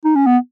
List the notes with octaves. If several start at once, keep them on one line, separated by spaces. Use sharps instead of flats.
D#4
C#4
B3